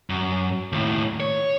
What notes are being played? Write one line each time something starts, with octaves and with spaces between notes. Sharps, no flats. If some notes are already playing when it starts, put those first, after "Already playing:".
F#2
D#2 A2
C#5